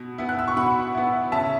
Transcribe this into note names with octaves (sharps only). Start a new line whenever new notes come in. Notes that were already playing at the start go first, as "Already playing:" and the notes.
Already playing: B2
B3 E4
F#6
E6
C#6
B2 F#5 B5
B3 E4
C#3 E5 A5